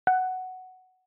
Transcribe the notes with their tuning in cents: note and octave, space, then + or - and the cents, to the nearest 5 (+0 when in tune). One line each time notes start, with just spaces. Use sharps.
F#5 +5